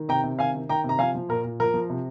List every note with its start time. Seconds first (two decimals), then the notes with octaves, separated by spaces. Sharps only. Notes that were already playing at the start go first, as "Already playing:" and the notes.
Already playing: D#3
0.08 C3 G5 A#5
0.23 C3
0.39 D#3 F5 G#5
0.55 D#3
0.69 D#3 G5 A#5
0.84 C3
0.89 A#5
0.99 F3 F5 G#5
1.15 F3
1.29 A#2 A#4
1.44 A#2
1.60 F3 A#4
1.74 F3
1.90 C3